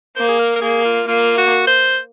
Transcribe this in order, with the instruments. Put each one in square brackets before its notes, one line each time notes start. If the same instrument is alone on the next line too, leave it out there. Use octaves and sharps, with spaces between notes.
[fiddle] A#3 [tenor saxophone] C5
[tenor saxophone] G#4
A#4
A#4
[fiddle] A#3 [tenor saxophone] G#4
[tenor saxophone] F4
[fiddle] A#3 [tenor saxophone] F4
[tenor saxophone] F#4
C5